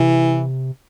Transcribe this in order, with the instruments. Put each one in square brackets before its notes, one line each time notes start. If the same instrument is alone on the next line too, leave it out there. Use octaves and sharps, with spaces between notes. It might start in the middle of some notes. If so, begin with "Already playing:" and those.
Already playing: [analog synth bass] C3 [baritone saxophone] E3